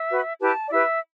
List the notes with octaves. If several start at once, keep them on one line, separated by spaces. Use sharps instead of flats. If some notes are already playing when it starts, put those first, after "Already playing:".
Already playing: E5
F#4 B4
E4 G4 B4 A5
D5
E4 G4 B4 E5